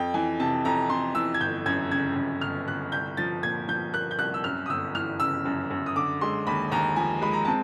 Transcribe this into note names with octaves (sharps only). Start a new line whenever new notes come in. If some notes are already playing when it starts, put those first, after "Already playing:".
Already playing: F2 G5
E3 G#5
C3 A5
F2 A#5
F2 C6
E3 E6
G#6
G1 G6
F#2 G#6
C#3 G#6
F#2
G1 F6
G1 F#6
C2 G6
F3 A6
A#2 G#6
F3 G6
A#3 F#6
G6
C2 F#6
E6
F#2 F6
D#6
G1 E6
E3 F6
C#3 E6
F#2
F#2
D#6
D3 D6
G#3 C6
D#2 B5
D#2 A#5
F3 G#5
G#3 B5
A#5
C4 A5